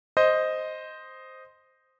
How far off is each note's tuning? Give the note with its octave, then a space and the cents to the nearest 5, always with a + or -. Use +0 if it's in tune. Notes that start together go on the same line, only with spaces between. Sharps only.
C5 +0 D#5 +0